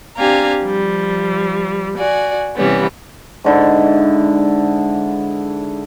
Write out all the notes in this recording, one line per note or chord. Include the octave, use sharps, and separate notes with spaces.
C4 D4 G4 F5 G#5 A#5
F3 G3
F#4 D5 G#5
C3 E3 G3 B3 C#4
G#2 D3 E4